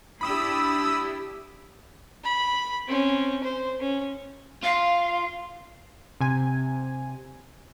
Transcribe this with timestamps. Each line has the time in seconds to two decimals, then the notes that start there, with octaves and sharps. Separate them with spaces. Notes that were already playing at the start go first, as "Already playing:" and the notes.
0.21 D4 E4 G4 B5 D#6 E6
2.24 B5
2.88 C4 C#4
3.43 C5
3.80 C#4
4.63 F4 F5
6.21 C3 G#5